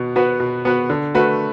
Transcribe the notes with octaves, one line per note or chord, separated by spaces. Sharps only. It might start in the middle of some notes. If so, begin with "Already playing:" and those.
Already playing: B2 B3
B3 F#4 B4
B2
B3 F#4 B4
D3
A3 F#4 B4